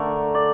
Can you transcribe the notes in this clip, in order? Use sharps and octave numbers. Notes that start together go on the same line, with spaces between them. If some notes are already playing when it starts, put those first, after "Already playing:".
Already playing: D3 A3 A#4
D5